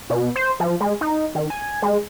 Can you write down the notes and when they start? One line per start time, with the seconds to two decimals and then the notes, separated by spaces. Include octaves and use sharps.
0.10 B2
0.36 C5
0.60 F3
0.80 G#3
1.01 D#4
1.35 D#3
1.50 G#5
1.82 G#3